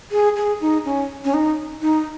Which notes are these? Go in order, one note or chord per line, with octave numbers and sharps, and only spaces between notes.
G#4
G#4
D#4
C#4
C#4
D#4
D#4